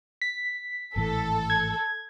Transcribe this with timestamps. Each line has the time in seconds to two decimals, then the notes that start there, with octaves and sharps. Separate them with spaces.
0.22 B6
0.96 G#1 A2 E3 A4
1.50 G#6